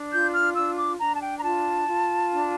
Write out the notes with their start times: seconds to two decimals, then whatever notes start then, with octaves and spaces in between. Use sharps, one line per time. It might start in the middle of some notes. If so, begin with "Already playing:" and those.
Already playing: D4
0.12 F4 G6
0.34 F6
0.56 D4 E6
0.77 D6
1.00 D4 A#5
1.15 A5
1.21 G5
1.39 A#5
1.43 F4 A5
1.88 F4
2.31 D4